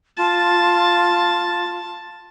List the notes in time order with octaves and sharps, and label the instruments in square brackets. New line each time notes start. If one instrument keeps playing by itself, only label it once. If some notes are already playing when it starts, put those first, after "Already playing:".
[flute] F4 [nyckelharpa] A5